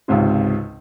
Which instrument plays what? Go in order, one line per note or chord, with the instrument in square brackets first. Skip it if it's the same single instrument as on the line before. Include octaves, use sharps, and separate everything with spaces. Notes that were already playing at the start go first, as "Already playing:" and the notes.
[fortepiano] G#1 C#2 G#2 C3 F4